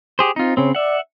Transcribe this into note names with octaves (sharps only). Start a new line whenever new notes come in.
G4 G#4 C5
C4 D#4 F4
C#3 C4 C#5
D5 E5 F#5